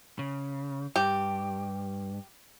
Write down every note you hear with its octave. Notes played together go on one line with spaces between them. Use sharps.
C#3
G2 G4